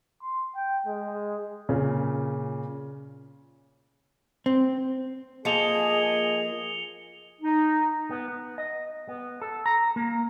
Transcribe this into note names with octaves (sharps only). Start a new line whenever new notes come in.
C6
G5
G#3
A#2 C#3
C4
F3 A#3 G#4 A4 D#5 C#7 F7 G7
D#4
B3
B3
D#5
B3
A4
A#5
A#3